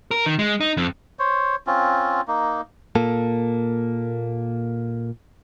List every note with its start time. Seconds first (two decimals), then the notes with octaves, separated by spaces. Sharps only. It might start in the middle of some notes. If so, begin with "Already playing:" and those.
0.11 A#4
0.26 D#3
0.39 G#3
0.60 D#4
0.77 F2
1.19 C5 C#5
1.67 C4 C#4 F4
2.28 A#3 D#4
2.95 A#2 A#3 A4